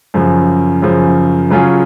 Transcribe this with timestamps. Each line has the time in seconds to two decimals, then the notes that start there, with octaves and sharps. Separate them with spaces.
0.14 F#2 C#3 F3
0.82 F#2 C#3 F3
1.50 C#3 F#3 C#4 F4 G#4